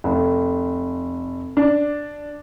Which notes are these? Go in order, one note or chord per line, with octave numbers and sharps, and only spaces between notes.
F1
D4